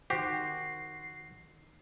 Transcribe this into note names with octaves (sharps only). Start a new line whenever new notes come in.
D#3 F#4 G4 C5 C7